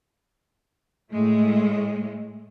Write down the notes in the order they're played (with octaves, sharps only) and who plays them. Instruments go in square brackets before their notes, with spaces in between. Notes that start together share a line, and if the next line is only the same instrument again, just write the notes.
[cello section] A2 G#3 A3